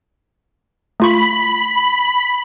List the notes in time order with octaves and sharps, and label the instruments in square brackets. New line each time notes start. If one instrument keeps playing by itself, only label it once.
[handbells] A3 F4 C#6 [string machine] B5